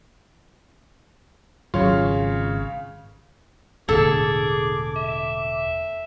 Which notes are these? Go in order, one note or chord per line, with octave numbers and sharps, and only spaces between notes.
G#1 C#3 F#3 F4 C#5 F5
E1 A2 D3 G#4 A4 D6
E5